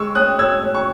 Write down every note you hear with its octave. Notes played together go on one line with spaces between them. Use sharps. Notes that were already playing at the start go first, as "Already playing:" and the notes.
Already playing: G#3 C#6 E6
C#4 D#6 F#6
C#4 E6 G#6
C#4
C#6